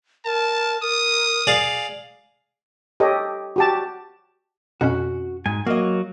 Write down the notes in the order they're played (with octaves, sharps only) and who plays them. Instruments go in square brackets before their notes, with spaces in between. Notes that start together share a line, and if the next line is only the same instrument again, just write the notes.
[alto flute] A#4 [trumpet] A5
[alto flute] A#4 [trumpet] D#6
[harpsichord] G#4 D5 F5
[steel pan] G4 A4 C#5 D#5
F#4 G4 A5
[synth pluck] F2 B2 C#4 [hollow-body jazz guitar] F#4
[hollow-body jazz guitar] G#2 [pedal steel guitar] G#5
[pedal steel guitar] F#3 F#4 [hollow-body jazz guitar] A#3 D#5